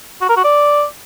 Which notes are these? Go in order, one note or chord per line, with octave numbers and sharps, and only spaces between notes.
F#4
A#4
F#4
D5